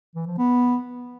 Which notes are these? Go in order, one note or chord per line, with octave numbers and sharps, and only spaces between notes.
E3
F3
B3